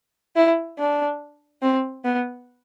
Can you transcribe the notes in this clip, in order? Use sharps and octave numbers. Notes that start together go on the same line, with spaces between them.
E4
D4
C4
B3